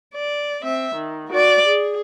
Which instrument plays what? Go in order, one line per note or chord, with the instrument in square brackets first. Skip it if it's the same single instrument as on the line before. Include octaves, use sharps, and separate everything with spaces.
[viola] D5
C4 E5
D#3
F#4 D5
G#4